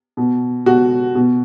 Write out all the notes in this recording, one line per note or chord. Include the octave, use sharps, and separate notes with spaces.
B2
B2 F#4
B2